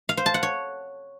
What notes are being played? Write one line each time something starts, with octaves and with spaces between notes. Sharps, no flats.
F5
C5
A5
F#5
C#5